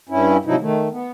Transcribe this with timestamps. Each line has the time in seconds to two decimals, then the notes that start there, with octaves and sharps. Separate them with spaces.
0.09 G2 C#4 E4
0.45 G#2 C3 F3 F#3 D#4 E4
0.61 D#3 A3
0.92 B3